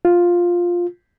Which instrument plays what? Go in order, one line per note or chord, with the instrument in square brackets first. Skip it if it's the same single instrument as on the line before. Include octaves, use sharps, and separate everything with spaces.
[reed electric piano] F4